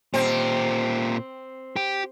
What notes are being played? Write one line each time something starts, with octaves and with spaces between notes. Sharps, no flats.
A#2 C4 G4
G4